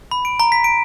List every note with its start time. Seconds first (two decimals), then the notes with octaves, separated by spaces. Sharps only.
0.11 B5
0.25 D7
0.40 A#5
0.52 B6
0.64 D7